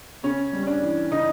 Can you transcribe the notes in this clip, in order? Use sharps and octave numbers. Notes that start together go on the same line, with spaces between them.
C#3 C#4
G3
C#4
D4
E3
C#3 D#4